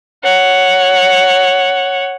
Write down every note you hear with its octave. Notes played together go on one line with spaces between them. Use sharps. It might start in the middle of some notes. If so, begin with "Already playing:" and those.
C#5 F#5